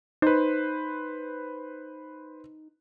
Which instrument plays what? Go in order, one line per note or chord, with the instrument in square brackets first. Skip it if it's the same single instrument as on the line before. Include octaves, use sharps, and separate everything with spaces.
[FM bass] D#4 [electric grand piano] B4 C5